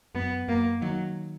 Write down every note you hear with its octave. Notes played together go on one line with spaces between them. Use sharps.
F#2 B3
F#2 A#3
D#3 F#3